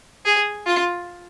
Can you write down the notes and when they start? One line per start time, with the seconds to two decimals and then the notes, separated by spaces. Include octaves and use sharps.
0.25 G#4
0.66 F4